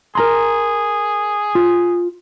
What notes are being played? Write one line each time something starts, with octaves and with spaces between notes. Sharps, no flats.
G#4 A#4 A#5 C6
F4